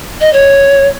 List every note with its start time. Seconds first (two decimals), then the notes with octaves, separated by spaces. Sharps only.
0.21 D#5
0.33 C#5